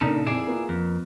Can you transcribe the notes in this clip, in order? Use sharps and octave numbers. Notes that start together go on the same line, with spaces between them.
A#2 C#3 A#3 D4 D#4 A4
F2 E4 G#4 D5 C7 E7
A#3 B3 F4
F2